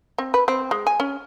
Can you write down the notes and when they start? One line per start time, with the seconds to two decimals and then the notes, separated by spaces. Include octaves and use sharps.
0.18 C4
0.34 B4
0.48 C4
0.71 G#3
0.87 G#5
1.00 C#4